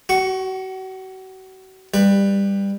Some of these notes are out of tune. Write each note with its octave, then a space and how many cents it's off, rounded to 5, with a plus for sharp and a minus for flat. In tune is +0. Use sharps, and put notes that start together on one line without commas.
F#4 +35 C#6 +0
G3 +15 B4 +0